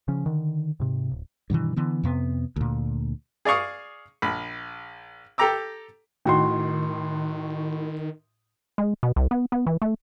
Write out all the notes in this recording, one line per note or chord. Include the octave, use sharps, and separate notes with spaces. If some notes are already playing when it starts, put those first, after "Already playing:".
C#3 F3 C#4
D3 D#3
G#2 C3
D1
G2 B2 D#3 E3
D3 E3 B3
F2 C3 B3
D2 A#2
G#4 D5 F5 C#6 D#6
A#1 B5
G4 A4 G5 A#5 D6 E6
A2 D#3 D#4 F#4 G5 C6
G#3
B2
C2
B3
B3
E3
A3